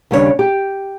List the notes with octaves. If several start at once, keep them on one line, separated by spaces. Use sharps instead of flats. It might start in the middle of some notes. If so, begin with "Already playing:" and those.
D#2 C#3 G3 D4 A4 C#5
G4